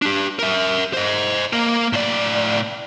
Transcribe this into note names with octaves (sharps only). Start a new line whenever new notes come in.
D4 G4
A#4 E5
C5 D#5
A#3 A#4
A2 D5